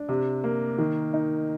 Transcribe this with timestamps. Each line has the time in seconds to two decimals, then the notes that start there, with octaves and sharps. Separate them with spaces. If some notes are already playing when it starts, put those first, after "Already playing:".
Already playing: D4
0.09 C3
0.44 A#3
0.78 D#3
1.14 D#4